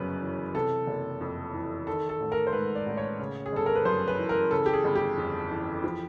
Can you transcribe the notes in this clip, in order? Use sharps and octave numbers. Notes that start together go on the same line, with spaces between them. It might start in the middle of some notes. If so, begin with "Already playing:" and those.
Already playing: G1 F#2 C#3 B4
E3
C3 A4
F#1
F2
E3
D#3 A4
A4
A1
A#4
C5
G#2 B4
D5
A1
C#5
C#3
G#4
G1 A4
A#4
B4
F#2 C5
B4
E3
A#4
C#3 A4
G4
G#4
G1
G4
F2
E3
F3